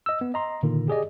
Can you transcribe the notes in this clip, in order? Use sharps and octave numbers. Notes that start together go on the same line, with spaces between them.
D#5 E6
B3
D#5 A#5 C6
A#2 D3 D#3 A#3
G4 G#4 D5 D#5